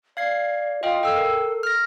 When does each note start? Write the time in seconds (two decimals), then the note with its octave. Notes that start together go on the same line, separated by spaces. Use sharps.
0.17 D5 F5 G#6 C7
0.83 F4 D#5 F5 G5
1.03 A4 G5 E6
1.16 A#4
1.63 F6 A#6